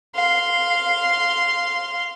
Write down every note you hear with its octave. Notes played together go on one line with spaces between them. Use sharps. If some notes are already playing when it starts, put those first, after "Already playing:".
F5 C6